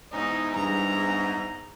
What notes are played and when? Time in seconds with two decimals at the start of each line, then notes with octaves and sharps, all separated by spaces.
0.13 E2 G#2 D#4
0.57 G2 A#5